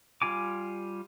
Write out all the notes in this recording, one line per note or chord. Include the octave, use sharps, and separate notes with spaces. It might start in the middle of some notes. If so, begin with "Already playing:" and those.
G3 F4 G#5 D6